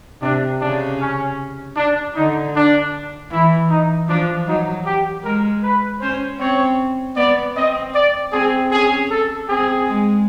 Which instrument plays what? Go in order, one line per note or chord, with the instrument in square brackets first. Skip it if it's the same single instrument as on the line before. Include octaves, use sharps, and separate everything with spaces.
[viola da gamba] C3 [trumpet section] D4
[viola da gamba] C#3 [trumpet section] D4
[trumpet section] C#4
D4
[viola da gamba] D3 [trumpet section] D#4
[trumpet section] D4
[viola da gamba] E3 [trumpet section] E4
[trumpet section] D#4
[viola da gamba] F3 [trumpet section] D4
[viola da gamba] F#3 [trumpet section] D#4
[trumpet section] G4
[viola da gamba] G#3 [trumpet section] A#4
[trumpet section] B4
[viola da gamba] C#4 [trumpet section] C5
[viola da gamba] C4 [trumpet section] C#5
[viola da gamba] B3 [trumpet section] D5
[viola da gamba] C4 [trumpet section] D#5
[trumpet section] D5
[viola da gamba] C4 [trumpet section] G#4
[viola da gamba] C#4 [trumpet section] G#4
[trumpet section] A4
[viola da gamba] C4 [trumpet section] G#4
[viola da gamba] G#3